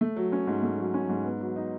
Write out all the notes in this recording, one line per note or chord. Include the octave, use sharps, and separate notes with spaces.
A3
F#3
C#4
G#2
A3
F#3
C#4
G#2
B3
F#3
D#4